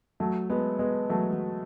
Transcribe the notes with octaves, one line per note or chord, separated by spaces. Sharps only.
F#3 A3
G#3 B3
G#3 B3
F#3 A3
F#3